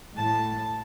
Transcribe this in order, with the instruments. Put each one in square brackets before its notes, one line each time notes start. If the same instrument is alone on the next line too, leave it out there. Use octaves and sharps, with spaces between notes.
[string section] A2 A5